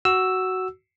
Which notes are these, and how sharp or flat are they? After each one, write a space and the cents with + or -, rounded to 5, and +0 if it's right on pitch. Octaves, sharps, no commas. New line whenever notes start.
F#4 +10 E6 +0